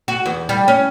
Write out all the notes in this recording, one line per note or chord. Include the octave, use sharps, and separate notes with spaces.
F#4
E2
G3
C#4